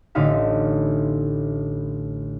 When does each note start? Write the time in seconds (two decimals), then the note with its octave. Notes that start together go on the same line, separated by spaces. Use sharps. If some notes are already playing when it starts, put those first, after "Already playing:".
0.15 A1 D3 D#4 F5 B5